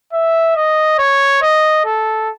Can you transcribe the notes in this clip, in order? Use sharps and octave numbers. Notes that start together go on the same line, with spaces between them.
E5
D#5
C#5
D#5
A4